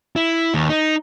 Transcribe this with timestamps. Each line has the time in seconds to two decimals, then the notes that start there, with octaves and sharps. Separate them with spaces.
0.16 E4
0.54 D#2
0.69 D#4